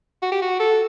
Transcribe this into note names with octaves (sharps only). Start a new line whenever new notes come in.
F#4
G4
F#4
A4